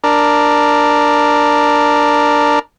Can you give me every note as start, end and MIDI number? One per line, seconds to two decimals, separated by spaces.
0.04 2.59 62
0.04 2.59 70